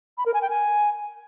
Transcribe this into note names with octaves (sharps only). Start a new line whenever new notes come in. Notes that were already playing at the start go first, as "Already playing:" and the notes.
B5
A#4
G#5
G5
G#5